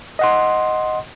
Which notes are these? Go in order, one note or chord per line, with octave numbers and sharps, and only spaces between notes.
D#5 F#5 C6